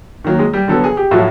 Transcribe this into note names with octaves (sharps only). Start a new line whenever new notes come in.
D#3 F#3 A#3
G#3 G#4
G3 G4
D3 F#3 B3 A4
G#4
G4
A2 F3 F#3 A3 F#4